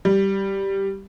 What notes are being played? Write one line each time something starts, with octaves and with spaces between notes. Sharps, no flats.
G3